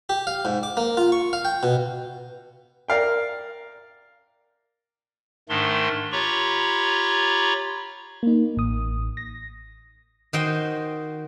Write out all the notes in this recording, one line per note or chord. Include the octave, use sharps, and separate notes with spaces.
G4
F5
G#2
D6
A#3
F4
C#6
F5
G5
B2
A#4 D5 F5 G5
G#2 D#3 A3 D4 C6
F4 G4 C#5 A#5 B5 C#6
A#3 D#4
A1 D#6
A#6
D#3 F#4 C5 D#5 G5 C6